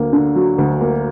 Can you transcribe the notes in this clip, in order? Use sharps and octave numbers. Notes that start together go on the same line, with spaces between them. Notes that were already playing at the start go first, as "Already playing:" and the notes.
Already playing: D2 A#3
D3
F#3
D2
A#3